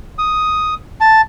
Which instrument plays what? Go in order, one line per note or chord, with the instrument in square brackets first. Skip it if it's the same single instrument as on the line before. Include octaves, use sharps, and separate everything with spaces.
[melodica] D#6
A5